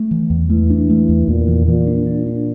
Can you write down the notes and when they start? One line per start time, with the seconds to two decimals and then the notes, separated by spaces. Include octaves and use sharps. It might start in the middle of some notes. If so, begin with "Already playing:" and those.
Already playing: A3
0.11 E3
0.30 E2
0.50 E3 A3
0.70 D4
0.90 A3
1.09 E2
1.28 E2 A#2
1.48 E3
1.68 A#2 E3
1.87 D4
2.07 D4
2.27 D4